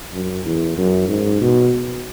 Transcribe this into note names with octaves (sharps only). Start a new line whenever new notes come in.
F#2
E2
F#2
G#2
B2